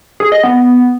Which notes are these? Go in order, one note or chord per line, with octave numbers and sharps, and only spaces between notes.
G#4
D#5
B3